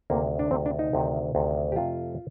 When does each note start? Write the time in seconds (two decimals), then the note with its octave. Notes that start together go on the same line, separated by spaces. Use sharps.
0.10 D2 C3 D#3 A#3
0.39 D4
0.51 D2 C3 D#3 C4
0.66 D4
0.79 D#4
0.93 D2 C3 D#3
1.35 D2 C3 D#3
1.72 G4
1.76 F2 C3 F3 A3 F4